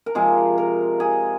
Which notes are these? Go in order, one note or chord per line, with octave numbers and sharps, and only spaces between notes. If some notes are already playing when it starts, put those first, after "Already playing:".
A#4
C3 F3 G#3 G#4
A#4
G#4